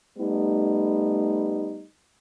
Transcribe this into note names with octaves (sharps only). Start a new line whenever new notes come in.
G3 A3 B3 D#4